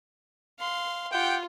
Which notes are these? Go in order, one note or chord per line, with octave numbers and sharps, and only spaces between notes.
F5 C6
F4 G4 F#5 G5